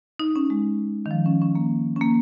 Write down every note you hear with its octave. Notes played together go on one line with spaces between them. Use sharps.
D#4
C#4
G#3
D#3
F3
C#4
C#4
A#3
C#4
A#3